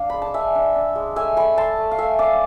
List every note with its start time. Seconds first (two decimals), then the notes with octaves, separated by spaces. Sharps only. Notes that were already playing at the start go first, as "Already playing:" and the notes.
Already playing: D4 D5 F5
0.10 G#3 B5
0.22 A5
0.34 D4 E5 G#5
0.55 D4
0.75 D4
0.95 G#3
1.16 A3 E5 G#5
1.37 A3 G#5 B5
1.57 A3 A5 C6
1.78 A3
1.91 F5
1.98 A3 E5 G#5
2.18 D4 D5 F5